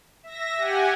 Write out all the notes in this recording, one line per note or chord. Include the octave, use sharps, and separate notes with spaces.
E5 A#6
G4 F#5 G#5